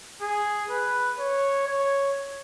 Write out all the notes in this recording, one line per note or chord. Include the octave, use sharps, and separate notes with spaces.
G#4
B4
C#5
C#5